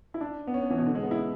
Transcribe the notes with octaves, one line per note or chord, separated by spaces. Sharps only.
E4
D4
B3
C#4
B3
E3
B2
D3
G#3
B3
E4